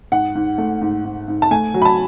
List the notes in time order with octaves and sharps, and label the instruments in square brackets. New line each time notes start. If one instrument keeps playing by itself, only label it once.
[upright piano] G#2 F#5
G#2
A3
G#2
G#2
G#2
A5
A3 G#5
F#3
B5
A5